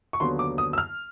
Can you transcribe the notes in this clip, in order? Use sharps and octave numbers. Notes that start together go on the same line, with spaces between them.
C#6
D#2 D3 F#3 B3 C6
D6
D#6
E6
F6